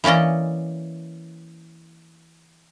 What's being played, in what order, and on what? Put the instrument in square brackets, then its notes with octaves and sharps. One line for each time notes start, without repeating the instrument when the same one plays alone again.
[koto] E3 A#3 C#4 D5 D#5